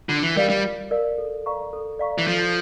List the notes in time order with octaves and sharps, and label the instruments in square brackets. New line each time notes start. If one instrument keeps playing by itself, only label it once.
[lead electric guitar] D3 [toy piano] F4
[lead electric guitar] E3
[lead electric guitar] G3 [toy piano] A#4 D5 F5
[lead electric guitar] G3
[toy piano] F4
A#4 D5 F5
A4
D5 F5 A#5 C#6
A4
D5 F5 A#5 C#6
[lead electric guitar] E3
[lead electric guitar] F3 [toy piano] A4